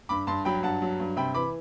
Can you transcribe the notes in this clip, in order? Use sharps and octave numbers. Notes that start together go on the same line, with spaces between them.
G2 B5 D6
G2 A5 C6
F#3 G5 B5
G2 F#5 A5
F#3
G2
C3 G5 B5
E3 B5 D6